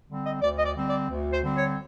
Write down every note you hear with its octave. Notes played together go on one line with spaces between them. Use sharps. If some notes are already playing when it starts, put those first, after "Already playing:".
D3 G3 C4
D#5
D2 D5
D#5
D5
D3 G3 C4
D5
D2
C5
D3 G3 C4
C#5